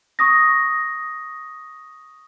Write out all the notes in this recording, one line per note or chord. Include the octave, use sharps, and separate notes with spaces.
C#6 D#6 A#6